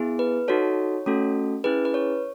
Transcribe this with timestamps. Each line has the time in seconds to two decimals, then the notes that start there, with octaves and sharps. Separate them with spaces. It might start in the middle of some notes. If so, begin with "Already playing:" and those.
Already playing: B3 E4 G#4
0.19 B4
0.48 D#4 F#4 A4 C#5
1.06 A3 C#4 F#4 A4
1.64 C#4 E4 G#4 B4
1.85 B4
1.94 C#5